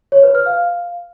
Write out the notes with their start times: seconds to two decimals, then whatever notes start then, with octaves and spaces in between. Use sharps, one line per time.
0.12 C#5
0.23 B4
0.35 F6
0.46 F5